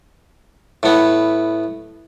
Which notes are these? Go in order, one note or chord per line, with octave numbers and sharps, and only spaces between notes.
A2 B3